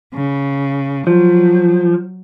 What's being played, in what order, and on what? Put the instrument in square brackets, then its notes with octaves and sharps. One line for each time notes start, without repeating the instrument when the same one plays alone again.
[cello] C#3
[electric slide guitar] F3 [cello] F#3